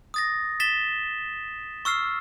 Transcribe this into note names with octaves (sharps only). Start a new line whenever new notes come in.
D#6 A6 A#6
A6 B6 E7 G7
C#6 E6 F6 C7